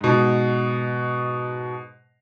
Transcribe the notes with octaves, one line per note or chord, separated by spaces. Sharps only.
G#2 B2